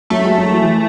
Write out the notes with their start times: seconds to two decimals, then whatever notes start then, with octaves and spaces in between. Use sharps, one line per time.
0.10 F#3 A3
0.25 G#3
0.38 F#3
0.51 E3
0.64 E3